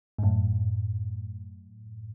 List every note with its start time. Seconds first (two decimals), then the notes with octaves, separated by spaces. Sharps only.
0.18 G#2
0.23 F#2 A2